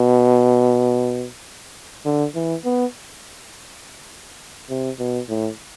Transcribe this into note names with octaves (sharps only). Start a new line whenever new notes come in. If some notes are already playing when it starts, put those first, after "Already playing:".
Already playing: B2
D3
E3
B3
C3
B2
A2